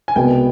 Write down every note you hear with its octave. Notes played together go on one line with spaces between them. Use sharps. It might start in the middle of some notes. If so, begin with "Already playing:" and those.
G#5
C2 B2 G#3 B3 G5